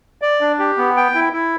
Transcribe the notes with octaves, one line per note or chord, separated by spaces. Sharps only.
D5
D4
G4
B3
G5
E4
E4